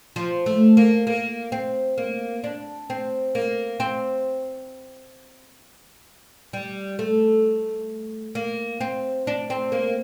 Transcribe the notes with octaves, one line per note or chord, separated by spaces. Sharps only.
F3
A3
A#3
A#3
C4
A#3
D4
C4
A#3
C4
G3
A3
A#3
C4
D4
C4
A#3